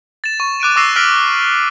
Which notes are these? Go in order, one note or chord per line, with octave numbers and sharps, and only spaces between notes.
A6 E7
C#6
D6 F#6 D7 D#7
C#6 D6 E6 A#6 C7 E7
E6 F6 A#6 B6 D7 F#7